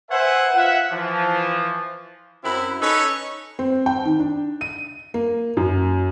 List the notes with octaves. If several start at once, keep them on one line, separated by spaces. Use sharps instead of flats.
B4 C5 E5 F#5 G#5
F4 E5 F#5
E3 F3
F#2 C4 E4
C#4 D#4 A4 B4 C#5
C4
G5
D#3
D4
D#7
A#3
F#2